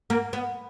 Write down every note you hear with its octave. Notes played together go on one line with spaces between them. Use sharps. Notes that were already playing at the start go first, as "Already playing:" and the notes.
A#3
B3